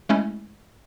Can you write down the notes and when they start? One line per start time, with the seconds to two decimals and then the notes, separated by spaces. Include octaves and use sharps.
0.09 G#3 A3 C#4 E4